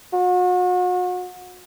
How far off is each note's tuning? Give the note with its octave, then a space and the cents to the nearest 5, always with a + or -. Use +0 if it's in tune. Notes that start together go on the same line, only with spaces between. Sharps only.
F#4 -40